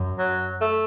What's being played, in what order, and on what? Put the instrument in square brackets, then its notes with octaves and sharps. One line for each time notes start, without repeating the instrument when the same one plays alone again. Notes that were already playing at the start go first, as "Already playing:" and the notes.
Already playing: [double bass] F#2
[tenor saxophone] F#3
A3